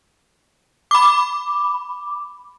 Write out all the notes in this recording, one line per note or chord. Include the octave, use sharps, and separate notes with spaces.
B5 D6